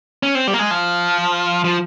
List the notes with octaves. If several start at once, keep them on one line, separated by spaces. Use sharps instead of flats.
C#4
C4
G3
A#3
G#3
F3
F3